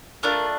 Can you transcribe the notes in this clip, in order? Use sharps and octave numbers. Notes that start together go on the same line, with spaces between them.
A3 D4 F4 A#4